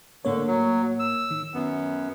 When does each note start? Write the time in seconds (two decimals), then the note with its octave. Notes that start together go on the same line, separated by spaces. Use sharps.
0.25 A2 D3 A#3 C#5
0.47 F#3
0.99 E6
1.31 D#3
1.54 F#2 B3